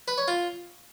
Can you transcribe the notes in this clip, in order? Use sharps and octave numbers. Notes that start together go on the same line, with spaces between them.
B4
C#5
F4